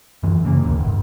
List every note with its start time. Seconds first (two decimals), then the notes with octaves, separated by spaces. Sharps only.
0.23 F#2 E3
0.45 C#3 A#3
0.62 A1 D#2
0.80 G1